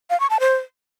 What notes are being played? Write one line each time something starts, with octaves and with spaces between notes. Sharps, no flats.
F5
C#6
A5
C5